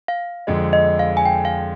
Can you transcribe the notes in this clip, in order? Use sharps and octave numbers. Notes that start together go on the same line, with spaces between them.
F5
F2 D3 G#3 D#5
D#5
F5
G#5
G5
F5